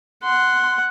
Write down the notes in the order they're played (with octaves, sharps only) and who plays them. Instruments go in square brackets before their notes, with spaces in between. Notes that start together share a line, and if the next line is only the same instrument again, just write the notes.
[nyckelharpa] F#5 [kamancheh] C6